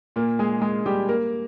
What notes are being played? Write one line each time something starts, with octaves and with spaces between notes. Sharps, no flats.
A#2 A#3
G#3 G#4
G#3 G#4
G3 G4
A#3 A#4